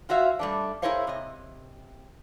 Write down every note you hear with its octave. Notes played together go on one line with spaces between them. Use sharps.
F4 F#4 C#5 E5 F5
G3 A3 D4
E4 G#4 A#4 C5 C#5 F5
C3 D#5